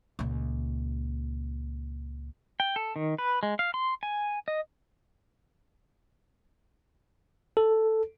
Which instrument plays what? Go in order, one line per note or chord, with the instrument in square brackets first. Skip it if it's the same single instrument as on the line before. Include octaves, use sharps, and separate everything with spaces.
[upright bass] C#2 A#2
[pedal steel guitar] G5
A4
D#3
B4
G#3
F5
C6
G#5
D#5
[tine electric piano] A4